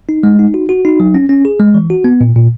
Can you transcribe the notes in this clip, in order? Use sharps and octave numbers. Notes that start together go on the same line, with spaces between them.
D#4
G#3
D#4
F#4
F#4
D#4
F#3
C#4
C#4
G#4
G#3
E3
F#4
B3
A#2
A#2